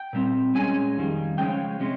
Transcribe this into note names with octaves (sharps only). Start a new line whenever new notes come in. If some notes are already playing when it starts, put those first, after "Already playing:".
Already playing: G5
A#2 G3 C4
A#2 G#3 C#4 G#5
F2 D#3 G3
C#3 F3 G#3 C#4 G5
C3 F3 G#3 C#4